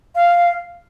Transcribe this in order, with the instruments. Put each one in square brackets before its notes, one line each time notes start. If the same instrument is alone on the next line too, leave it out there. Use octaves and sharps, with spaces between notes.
[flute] F5